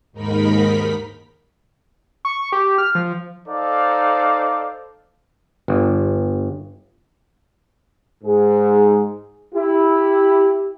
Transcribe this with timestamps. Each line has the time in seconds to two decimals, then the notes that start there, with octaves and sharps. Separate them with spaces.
0.12 D#2 G#2 D#4 A#4 B5 B6
2.25 C#6
2.52 G4
2.78 F6
2.95 F3
3.48 D#4 A4 C5 D5 F5
5.68 G1
8.24 G#2 G#4
9.55 E4 G4